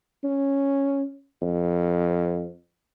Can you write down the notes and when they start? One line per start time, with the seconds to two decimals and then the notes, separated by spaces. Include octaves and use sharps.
0.24 C#4
1.42 F2